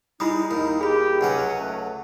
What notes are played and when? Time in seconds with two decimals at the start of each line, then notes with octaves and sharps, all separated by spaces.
0.20 G3 G#3 D#4 E4 B5 D#6
0.51 D#2 D#3
0.81 G4 G#4 B5
1.21 C#2 F#3 C#4 B4 F#5
1.60 A3